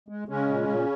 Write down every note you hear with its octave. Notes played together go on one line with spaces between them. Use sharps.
G#3
C#3 G#3 C#4
A#2
A#2